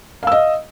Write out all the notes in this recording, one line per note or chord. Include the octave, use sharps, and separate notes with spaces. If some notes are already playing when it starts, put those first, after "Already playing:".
D#5 F5 E6